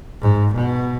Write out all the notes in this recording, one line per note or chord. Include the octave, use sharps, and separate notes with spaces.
G#2
B2